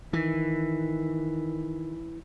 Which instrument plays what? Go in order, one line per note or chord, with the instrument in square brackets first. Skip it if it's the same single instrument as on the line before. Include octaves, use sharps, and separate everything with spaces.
[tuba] D#3 [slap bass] E3